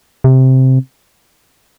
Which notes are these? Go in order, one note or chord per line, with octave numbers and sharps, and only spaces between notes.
C3